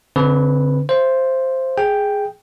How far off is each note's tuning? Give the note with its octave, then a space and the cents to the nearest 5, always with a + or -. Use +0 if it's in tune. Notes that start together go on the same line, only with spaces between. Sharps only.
D3 -40 C4 +0 B4 +0
C5 +0 E5 +45
G#4 +0 G5 +5